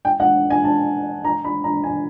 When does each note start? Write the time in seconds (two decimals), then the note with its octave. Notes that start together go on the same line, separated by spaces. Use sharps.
0.05 G5
0.20 F#5
0.50 G#5
0.64 A5
1.25 A#5
1.45 B5
1.64 A#5
1.83 G#5